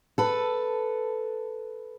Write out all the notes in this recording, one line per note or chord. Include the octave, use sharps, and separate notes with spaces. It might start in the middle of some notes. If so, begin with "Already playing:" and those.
A4 B4